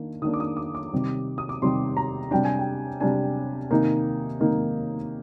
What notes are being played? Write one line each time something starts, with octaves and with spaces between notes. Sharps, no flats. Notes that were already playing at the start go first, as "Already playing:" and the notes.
Already playing: D#3 A#3 D4
D#3 A#3 D4 D#6
D6
D#6
D6
D6
C3 D#3 G3
D#6
D6
C3 D#3 G3 C6
A#5
C3 G3 D4 G5
G#5
G5
C3 G3 D4 G#5
C3 D#3 A#3 D#4
C3 D#3 A#3 D#4